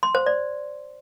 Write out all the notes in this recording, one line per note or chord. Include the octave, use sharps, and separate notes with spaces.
C6
C5
D5